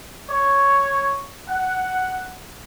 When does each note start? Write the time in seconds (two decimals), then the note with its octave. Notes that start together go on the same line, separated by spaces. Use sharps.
0.29 C#5
1.49 F#5